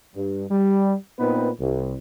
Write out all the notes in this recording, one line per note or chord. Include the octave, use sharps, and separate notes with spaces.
G2
G3
A#2 B3 C4 D#4 B4
C2